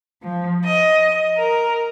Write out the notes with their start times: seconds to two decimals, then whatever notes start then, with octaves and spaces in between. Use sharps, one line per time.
0.23 F3
0.64 D#5
1.36 A#4